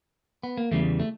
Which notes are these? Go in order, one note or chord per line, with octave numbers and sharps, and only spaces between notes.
B3
A#3
E2 C#3 E3 G3 A3
A3